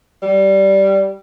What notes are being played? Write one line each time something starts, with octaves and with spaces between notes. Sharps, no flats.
G3